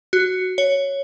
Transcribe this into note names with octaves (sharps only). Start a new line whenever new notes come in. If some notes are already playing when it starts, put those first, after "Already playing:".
F#4
C#5